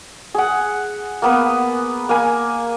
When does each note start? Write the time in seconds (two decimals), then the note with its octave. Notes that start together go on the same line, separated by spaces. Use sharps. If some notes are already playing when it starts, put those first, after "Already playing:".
0.35 G#4 F#5
1.22 A#3 B3 B4
2.09 A#3 G#5